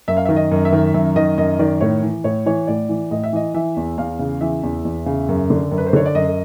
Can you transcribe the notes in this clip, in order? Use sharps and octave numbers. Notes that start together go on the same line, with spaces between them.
F#2 E5
F5
D#3 E5
D#5
F#2
E5
D#3
F#2 E5
D#3 D#5
F#2 D#5
D#3 D5
A2 C#5
E3
A2 C#5
E3 C#5
A2 D5
E3
A2 D#5
E5
E3 D#5
E3 E5
E2
E2 F5
C#3
E3 E5
E2
E2
C#3
F#2
D3
F#2
B4
C5
D3 C#5
D5
F#2 D#5